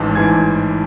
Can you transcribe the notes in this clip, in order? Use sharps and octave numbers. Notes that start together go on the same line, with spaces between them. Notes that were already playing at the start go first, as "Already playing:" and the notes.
Already playing: A1 G#2 E3 A5
A1 G#2 E3 G#5 G#6